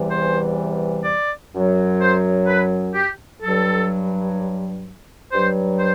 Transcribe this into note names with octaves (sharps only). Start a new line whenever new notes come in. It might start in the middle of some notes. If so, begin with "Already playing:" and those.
Already playing: E2 C3 E3 G3
C5
D5
F#2 F#3
C5
B4
G4
G2 F#3 A4
G2 F#3 C5
C5